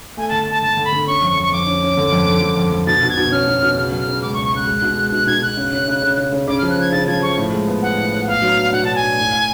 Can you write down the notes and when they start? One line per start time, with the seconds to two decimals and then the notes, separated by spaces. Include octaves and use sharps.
0.17 A3 G#5
0.29 D3 A5
0.47 A3 A5
0.62 D3 A5
0.77 D3
0.85 B5
0.93 D3
1.07 C#4 C#6
1.22 F2
1.30 C#6
1.37 F2
1.43 C#6
1.52 F2 D6
1.67 C#4
1.82 C#4
1.97 D3
2.12 F2
2.28 D3
2.42 F2
2.57 F2
2.72 F2
2.87 B2 A6
3.03 B2
3.10 G#6
3.17 B2
3.32 C#4 F6
3.47 B2
3.63 B2
3.77 C#3 F6
3.92 F#3
4.00 F6
4.07 C#3
4.22 C#2 D6
4.34 C#6
4.37 C#3
4.45 C#6
4.52 C#2 F#6
4.67 G#3
4.82 B2
4.97 G#3
5.12 B2 F#6
5.27 B2 G#6
5.42 B2 F#6
5.57 C#3
5.72 C#4
5.88 C#3
6.02 C#3
6.17 C#3
6.33 C#3
6.47 C#3 D6
6.58 F3 F6
6.70 F#6
6.77 F3 G#6
6.92 C#3 A6
7.07 F3 G#6
7.22 F3 C#6
7.37 A2
7.52 G#3
7.68 B3
7.82 B3 F#5
7.98 A2
8.12 A2
8.27 B3 F5
8.42 F#3
8.57 D4
8.73 B2 F#5
8.84 F#3 A5
8.95 G#5
9.02 D4
9.17 A2
9.32 A2